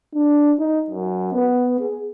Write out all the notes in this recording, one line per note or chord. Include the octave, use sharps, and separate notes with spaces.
D4
D#4
F#2
B3
G#4